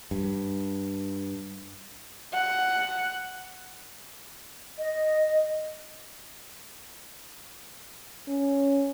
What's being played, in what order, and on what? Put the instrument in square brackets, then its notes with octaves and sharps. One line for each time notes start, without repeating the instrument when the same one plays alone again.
[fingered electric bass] G2
[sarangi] F#5
[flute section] D#5
[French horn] C#4